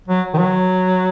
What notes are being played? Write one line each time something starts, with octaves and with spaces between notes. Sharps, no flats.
F#3
D#3
F#3